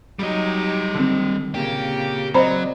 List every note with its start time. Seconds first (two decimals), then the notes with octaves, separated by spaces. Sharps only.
0.19 F#3 G3 D#4 G4 D#5
0.95 D3 D#3 C4
1.55 A#2 C#3 A#3 G4
2.34 F#3 C4 C5 D5 D#5 A#5 B5